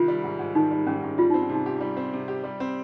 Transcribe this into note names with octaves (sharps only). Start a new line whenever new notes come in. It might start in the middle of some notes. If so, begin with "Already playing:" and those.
Already playing: C2 D#3 F4
G3
G#2
G#2
D#3 D#4
G3
G#2 C#4
G#2
G3 F4
C4 D#4
C#4
C3
D#4
G4
G3
C4
C3
G4
G3
C4